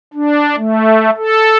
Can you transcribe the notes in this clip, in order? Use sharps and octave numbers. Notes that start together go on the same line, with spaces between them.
D4
A3
A4